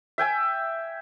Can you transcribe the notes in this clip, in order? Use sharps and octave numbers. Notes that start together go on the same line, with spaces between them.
E5 G5 G#5